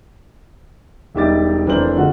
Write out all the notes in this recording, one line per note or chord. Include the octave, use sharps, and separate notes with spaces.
E1 G3 D#4 E5 D6 A6
F1 E3 D4 A#4 C5 F#7
D3 G#3 F4 F#4